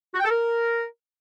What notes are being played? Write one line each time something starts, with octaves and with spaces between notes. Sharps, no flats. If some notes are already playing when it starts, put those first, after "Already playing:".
F#4
G5
A4
A#4